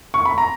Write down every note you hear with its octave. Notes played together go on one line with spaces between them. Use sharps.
C#6
B5
A#5